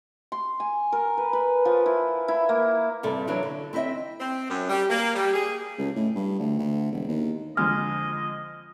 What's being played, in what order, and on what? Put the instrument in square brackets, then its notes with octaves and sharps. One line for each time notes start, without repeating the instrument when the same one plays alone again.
[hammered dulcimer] C6
G#5
A#4
B4
B4
F3
E4
E4
A#3
[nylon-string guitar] G2 C3 A4
E3 F#3 D4
D3
C4 E4 A#4 D#5 E5
[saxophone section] C4
F#2
G3
A#3
G3
G#4
[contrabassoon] C#2
A2
G2
D2
D2
E1
D#2
[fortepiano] F2 D3 G#3 [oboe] D#5 [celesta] F6